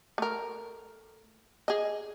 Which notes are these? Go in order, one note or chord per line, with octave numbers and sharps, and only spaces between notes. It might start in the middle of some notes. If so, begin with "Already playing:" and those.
A3 A#4
G#4 D#5